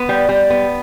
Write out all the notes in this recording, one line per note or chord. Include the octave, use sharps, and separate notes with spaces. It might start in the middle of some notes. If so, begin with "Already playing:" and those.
Already playing: B3
G3
G3
B3